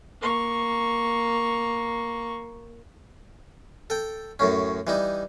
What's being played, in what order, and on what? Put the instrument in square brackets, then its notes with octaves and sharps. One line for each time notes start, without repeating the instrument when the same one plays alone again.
[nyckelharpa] A#3 C#6
[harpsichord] A4 G5
F#2 A2 C#4
E3 G3 D#4